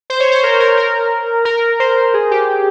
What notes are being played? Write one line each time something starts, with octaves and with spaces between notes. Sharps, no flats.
C5
C#5
C5
A#4
A#4
A#4
A#4
C5
G#4
G4